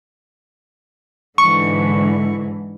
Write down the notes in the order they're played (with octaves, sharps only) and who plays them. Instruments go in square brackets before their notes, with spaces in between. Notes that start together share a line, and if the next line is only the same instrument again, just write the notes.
[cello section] G#2 D3 E3 [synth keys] C#6